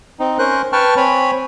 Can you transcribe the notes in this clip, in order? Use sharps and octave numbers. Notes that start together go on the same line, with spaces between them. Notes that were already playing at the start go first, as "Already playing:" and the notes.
C4 D#4
C#4 A#4 C5 F#6
B4 G5 A5 C#6 F6
C4 C#5 G#5 B5